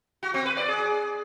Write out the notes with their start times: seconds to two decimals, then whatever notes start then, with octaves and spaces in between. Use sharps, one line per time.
0.23 F#4
0.34 C4
0.46 B4
0.57 D5
0.68 G#4